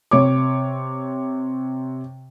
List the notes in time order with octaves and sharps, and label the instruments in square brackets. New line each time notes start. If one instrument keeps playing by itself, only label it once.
[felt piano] C3 C#5 D6